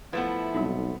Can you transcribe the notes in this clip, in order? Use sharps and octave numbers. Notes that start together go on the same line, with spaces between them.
F3 A3 B3 E4 B4 F5
B1 G3 C4 D#4